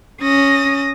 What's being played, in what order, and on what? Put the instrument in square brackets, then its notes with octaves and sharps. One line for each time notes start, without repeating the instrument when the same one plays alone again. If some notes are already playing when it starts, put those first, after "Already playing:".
[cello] C#4 [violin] D#6 A#6